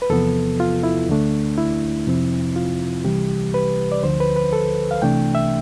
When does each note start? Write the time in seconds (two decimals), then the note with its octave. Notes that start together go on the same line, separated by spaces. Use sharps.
0.02 B4
0.10 E2 C3 F3 B3 A4
0.60 F4
0.83 E4
1.09 D2 D3 A3 D4
1.58 E4
2.07 F2 C3 F3 C4
2.56 F4
3.05 C2 C3 E3 G3 G4
3.54 B4
3.92 D5
4.03 D2 D3 F3 C5
4.20 B4
4.36 B4
4.53 A4
4.91 F5
5.02 C2 C3 E3 A3 D4 G5
5.35 E5